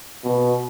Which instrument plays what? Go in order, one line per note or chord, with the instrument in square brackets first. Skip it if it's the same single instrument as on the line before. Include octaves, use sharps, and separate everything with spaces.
[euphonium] B2